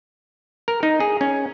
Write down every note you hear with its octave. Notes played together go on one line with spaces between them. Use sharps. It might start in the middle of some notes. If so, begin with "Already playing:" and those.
A#4
D#4
G#4
C#4